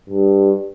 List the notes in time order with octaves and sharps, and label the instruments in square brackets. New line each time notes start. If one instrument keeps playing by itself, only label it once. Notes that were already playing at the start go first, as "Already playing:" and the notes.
[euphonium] G2